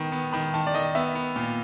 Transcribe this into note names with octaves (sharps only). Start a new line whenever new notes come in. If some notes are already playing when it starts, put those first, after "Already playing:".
Already playing: D#3 B3
B3
D#3 B5
D#3 A5
D5
D#3 D#5
B3 E5
B3
A#2